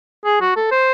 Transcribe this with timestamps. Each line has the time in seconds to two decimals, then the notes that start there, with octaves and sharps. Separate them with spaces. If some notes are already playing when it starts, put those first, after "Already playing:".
0.25 G#4
0.41 F#4
0.56 A4
0.71 C5